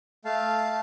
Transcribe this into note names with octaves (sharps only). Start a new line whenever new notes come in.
A3 F5 A5